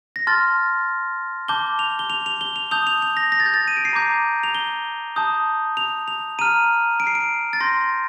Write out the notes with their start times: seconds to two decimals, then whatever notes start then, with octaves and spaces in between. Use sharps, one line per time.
0.16 A#6
0.27 A5 C6 F6 A6
1.48 A5 D6 G6 G7
1.79 F7
1.99 G7
2.10 F7
2.26 F7
2.41 G7
2.56 F7
2.71 A5 D#6 G6 F7
2.87 F7
3.02 F7
3.17 A#6
3.32 A#6
3.40 A6
3.46 G6
3.54 A6
3.68 D#7
3.77 D7
3.85 C7
3.93 A#5 D6 G6 A#6
4.43 F7
4.55 G7
5.16 A5 D#6 G6
5.77 F7
6.08 F7
6.39 A#5 F6 D#7
7.00 D7
7.07 C7
7.15 D7
7.53 A6
7.60 C6 G6 A#6